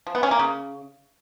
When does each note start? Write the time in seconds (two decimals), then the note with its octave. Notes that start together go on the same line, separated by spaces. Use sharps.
0.07 F3
0.15 B3
0.23 C#4
0.31 A#3
0.39 C#3